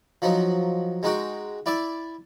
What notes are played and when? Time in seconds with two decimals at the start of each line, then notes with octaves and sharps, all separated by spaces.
0.22 F3 F#3 D#4
1.03 G#3 D#4 F#4 G5
1.66 E4 D5 E5 D6